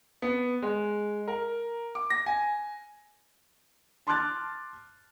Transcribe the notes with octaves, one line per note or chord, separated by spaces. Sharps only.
B3
G#3
A#4
D6
A#6
G#5
A5 C6 D6 F6 F#6 A6